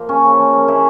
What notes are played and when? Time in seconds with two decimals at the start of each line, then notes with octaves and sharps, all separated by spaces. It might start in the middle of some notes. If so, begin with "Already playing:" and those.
Already playing: F3 A#3
0.09 C#3 C#4
0.24 C#3
0.38 F3
0.53 A#3
0.68 C#3 E4